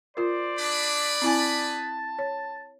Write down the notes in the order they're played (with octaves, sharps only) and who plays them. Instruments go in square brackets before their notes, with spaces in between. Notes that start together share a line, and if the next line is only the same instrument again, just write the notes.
[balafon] F4 A#4 [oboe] C5 [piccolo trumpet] D5
[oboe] D4 [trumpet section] G#4 B4 B5
[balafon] C4 E4 G#5 [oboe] A5
[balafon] C#5